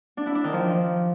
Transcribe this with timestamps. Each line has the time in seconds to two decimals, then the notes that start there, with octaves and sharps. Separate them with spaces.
0.17 D4
0.26 E4
0.35 D4
0.44 D#3
0.53 F3